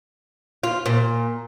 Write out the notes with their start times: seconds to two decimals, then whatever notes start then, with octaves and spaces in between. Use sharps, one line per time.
0.63 F4
0.86 A#2